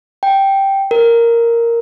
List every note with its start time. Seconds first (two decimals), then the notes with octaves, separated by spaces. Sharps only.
0.23 G5
0.91 A#4